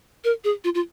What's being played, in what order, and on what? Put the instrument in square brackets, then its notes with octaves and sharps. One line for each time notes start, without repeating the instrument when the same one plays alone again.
[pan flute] A#4
G#4
F4
F4